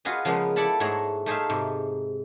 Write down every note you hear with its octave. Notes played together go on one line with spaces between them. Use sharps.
F4 F#4 G#4 B4 D#5
C#3 F3 G#3 A#3 B3
E4 A4 D5 F#5 A5 B5
G#2 A3 G#4 C#5 F#5 A#5
A3 D#4 G#4 C5 E5 F5
G#2 C3